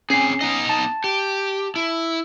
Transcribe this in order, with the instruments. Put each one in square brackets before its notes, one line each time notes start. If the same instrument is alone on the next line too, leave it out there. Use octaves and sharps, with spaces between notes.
[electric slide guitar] C4 G#4 [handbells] C#4 C7
[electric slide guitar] B3 D#4 D#5
[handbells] A5
[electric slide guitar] G4
E4